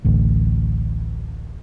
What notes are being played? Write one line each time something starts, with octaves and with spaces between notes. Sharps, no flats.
A1 D2